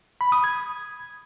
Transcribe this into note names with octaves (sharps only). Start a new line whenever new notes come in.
B5
D#6
G#6